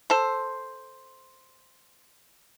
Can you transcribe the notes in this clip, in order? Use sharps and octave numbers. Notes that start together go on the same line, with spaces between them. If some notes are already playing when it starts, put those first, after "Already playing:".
A4 C5